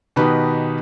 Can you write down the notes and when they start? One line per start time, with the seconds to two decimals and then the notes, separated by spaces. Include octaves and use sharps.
0.16 B2 D#3 D#4 G4 B4